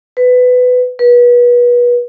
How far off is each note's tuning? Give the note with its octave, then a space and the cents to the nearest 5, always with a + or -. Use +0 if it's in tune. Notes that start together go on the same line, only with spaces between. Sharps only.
B4 +15
B4 -30